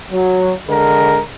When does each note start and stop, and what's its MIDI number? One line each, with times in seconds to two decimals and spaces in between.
0.12 0.52 54
0.69 1.19 50
0.69 1.19 56
0.69 1.19 70